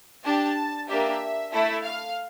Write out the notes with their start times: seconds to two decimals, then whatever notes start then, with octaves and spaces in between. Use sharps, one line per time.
0.24 D4 G4 A5
0.88 A#3 D4 G4 E5
1.52 A3 E4 A4 E5
1.83 F5